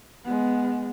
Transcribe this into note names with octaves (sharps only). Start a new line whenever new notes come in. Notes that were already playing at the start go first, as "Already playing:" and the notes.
G#3 B3